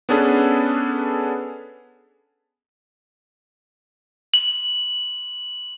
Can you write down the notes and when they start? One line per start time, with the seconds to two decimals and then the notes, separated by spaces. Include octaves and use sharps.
0.09 B3 C#4 D4 G#4 A4 B4
4.34 F#7